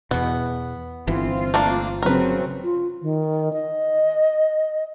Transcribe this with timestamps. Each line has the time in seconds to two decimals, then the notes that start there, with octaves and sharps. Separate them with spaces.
0.11 E2 B2 B3
1.07 G1 E3 C4 F4
1.54 A3 A#3 D4
2.02 C#3 F#3 C4 A#4 B4
2.64 F4
3.02 D#3
3.53 D#5